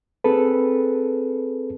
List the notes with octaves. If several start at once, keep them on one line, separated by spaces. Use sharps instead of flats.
C4 G#4 A4 B4